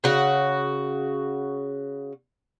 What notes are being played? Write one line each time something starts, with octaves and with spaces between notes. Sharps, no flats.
C#3 F#4